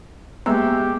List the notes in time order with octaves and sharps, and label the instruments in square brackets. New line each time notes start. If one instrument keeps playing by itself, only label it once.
[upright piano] G#3 E6 [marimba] A#3 [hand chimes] B3 E5 G5 [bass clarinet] G4